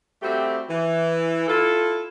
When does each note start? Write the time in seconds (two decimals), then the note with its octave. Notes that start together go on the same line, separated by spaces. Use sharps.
0.22 G3 A3 C4 F#4 G4
0.70 E3
1.48 E4 F4 A4